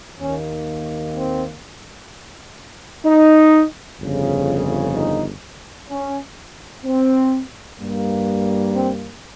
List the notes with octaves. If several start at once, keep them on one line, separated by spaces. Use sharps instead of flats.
D#2 D#3 A#3 C#4
C4
D#4
G1 F2 C#3
D#4
C#4
C4
G2 G3 A#3
C4